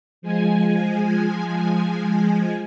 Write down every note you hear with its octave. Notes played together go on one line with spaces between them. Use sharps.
F3 G#3 G#5